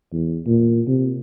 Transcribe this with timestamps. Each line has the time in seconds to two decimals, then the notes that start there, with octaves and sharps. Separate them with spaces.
0.12 E2
0.46 A#2
0.87 C3